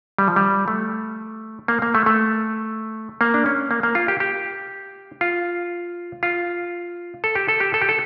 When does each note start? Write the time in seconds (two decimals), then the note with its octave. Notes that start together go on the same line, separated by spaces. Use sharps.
0.18 G3
0.28 F3
0.36 G3
0.68 A3
1.68 A#3
1.82 A#3
1.95 A3
2.06 A3
3.21 A#3
3.34 D4
3.46 C#4
3.71 A#3
3.83 A#3
3.95 F4
4.08 G4
4.20 G4
5.21 F4
6.23 F4
7.24 A4
7.35 G4
7.48 A4
7.60 G4
7.74 A4
7.82 G4
7.89 A4